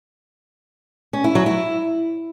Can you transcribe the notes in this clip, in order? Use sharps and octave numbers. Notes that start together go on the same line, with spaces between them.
C#4
E4
F#3
E4